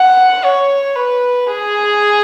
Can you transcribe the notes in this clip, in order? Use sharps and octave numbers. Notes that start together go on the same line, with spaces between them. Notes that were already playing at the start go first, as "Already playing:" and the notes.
Already playing: F#5
C#5
B4
G#4